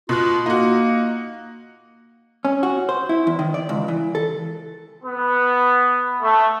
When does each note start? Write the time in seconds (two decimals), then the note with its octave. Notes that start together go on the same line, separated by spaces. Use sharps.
0.09 B2 F4 F#6
0.46 A#3 D#4 F#4
2.45 C#4
2.63 F#4
2.89 C5
3.09 E4
3.27 E2
3.39 D#3
3.54 D5
3.69 C#2
3.88 E3
4.15 A4
5.04 B3
6.21 A3